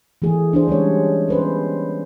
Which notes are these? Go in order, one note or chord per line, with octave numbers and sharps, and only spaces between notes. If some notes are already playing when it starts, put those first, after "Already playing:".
E3 A3 G#4
D4 G#4 C5
G3 G#3 C#4 C#5
C#4 B4 C5